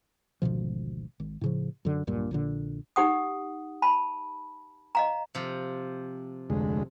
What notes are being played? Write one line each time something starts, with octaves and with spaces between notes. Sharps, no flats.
G#1 D2 B2 F3
G#1
A2 C#3 F3
F#2 D3
D1 A#1 G2 A#2
A#1 A#2 D3
D#4 G4 F#5 D#6
A5 B5
D#5 F5 A#5
C3 F3
F1 D2 G#3